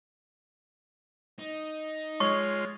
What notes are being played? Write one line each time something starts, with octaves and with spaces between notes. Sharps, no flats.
D#4
G#3 F4 C#5 C#6